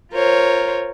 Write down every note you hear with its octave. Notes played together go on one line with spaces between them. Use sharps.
F4 A#4 C5 C#5